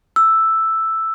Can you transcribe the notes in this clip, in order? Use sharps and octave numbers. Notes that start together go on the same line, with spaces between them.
E6